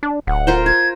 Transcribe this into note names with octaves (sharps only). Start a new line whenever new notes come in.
D4
D1 F#5
F4 A#4 C5
F4 G#6